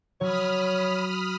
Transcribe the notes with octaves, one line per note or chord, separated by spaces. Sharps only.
F#3 C#5 B5 D#6 F6